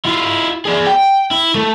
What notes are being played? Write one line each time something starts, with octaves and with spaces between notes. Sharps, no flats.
E4 F4
G#4 D5
G5
E4
A3